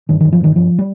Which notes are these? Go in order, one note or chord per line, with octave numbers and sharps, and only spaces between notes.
G2 D#3
G2 D#3
F3
G2 D#3
G2 F3
G3